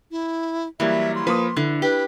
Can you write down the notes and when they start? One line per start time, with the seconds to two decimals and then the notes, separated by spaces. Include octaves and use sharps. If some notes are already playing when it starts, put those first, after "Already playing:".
0.11 E4
0.80 E3 F#3 G3 A#3 E4 E5
1.15 C6
1.27 F3 A#3 B4 D#6
1.57 D3 E4
1.82 G4 B4